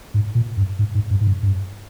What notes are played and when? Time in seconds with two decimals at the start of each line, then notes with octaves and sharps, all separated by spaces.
0.14 G#2
0.35 A#2
0.57 G2
0.79 G#2
0.95 G#2
1.10 G2
1.21 G#2
1.27 G2
1.43 G2